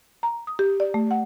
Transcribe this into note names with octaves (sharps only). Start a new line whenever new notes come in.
A#5
D#6
G4
D5
A3
F#5